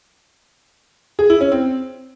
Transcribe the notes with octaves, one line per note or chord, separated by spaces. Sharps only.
G#4
E4
C#4
C4